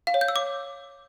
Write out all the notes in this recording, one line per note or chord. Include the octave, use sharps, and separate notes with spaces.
F5
C#5
G6
E6
D6